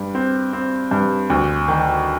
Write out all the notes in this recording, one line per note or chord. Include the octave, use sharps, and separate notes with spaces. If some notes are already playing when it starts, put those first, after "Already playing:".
Already playing: G2
C4
C4
G2
D2
D#3